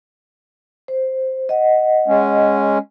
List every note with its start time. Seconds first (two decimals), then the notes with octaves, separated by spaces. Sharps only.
0.88 C5
1.49 D#5 F#5
2.07 G#3 C#4